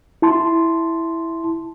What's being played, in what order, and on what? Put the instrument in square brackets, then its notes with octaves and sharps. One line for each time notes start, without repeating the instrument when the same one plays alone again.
[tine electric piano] E4 A5 C6